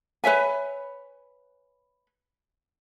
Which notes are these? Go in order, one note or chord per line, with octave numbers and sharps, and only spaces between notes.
B4 C#5 E5 G#5